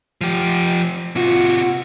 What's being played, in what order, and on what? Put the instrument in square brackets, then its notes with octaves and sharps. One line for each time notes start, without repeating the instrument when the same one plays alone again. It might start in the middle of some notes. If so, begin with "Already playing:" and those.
[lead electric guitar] F3 G4
[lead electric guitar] C3 F#4 [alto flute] F4